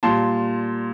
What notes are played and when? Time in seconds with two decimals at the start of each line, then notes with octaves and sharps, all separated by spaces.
0.03 A#2 G3 A5 C6